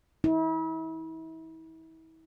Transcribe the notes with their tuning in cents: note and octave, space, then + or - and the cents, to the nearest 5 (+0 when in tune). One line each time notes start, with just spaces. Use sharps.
E4 -40